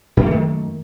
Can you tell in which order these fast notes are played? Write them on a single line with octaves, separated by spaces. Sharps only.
F#2 A#3 A3 D#3